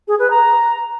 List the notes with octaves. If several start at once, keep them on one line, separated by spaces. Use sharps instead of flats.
G#4
B4
A#5